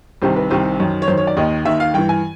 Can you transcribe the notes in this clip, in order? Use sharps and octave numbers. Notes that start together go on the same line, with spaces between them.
C2 C3 D#3 C5
B4
C2 C3 D#3 C5
F#2 D#3
C#5
F#2 D#3 C5
C#5
D5
D#2 D#3 D#5
D#2 D#3 E5
F5
G2 E3 G5
G#5